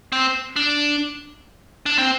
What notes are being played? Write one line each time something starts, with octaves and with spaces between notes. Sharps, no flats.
C4
D4
D4
C4